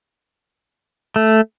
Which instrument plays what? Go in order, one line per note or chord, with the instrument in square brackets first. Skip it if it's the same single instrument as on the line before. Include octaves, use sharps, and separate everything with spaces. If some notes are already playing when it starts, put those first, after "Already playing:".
[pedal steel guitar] A3